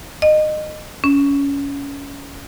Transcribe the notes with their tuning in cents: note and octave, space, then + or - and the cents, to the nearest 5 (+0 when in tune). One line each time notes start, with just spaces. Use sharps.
D#5 -20
C#4 +20